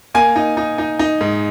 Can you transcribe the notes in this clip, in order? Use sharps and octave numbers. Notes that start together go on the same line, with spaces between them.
A#3 G#5
D#4
D#4
D#4
D#4
G#2